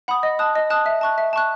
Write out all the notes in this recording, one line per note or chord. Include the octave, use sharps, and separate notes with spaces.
F#5 B5 D#6
D#5
A5 D#6 F#6
D#5
A5 D#6 F#6
E5
A5 C#6 F#6
E5
A5 C#6 F#6